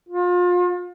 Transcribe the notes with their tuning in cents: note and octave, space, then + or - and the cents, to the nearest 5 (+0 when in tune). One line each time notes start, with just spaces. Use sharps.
F4 +30